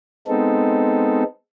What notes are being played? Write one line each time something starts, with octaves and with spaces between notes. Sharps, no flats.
G#3 B3 C4 D#4 A4